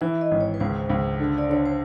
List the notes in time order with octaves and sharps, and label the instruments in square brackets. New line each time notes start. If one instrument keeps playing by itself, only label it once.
[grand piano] E3 [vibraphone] E5
[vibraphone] D#5
[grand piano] G#1
[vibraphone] C#5
B4
[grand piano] C#2 [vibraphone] C5
[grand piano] C#2
D3
[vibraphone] D5
[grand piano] D3 [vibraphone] C#5
[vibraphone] C5